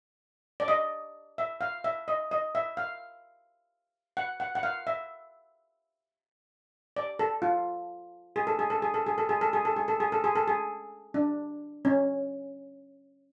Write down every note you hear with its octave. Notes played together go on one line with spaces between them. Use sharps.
D5
D#5
E5
F5
E5
D#5
D#5
E5
F5
F#5
F#5
F#5
F5
E5
D5
A4
F4
G#4
A4
G#4
A4
G#4
A4
G#4
A4
G#4
A4
G#4
A4
G#4
A4
G#4
A4
G#4
A4
G#4
D4
C#4